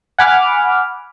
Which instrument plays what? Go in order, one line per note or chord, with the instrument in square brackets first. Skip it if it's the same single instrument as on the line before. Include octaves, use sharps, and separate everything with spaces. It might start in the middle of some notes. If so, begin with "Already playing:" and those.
[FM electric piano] F#5 G#5 B5 D6 F6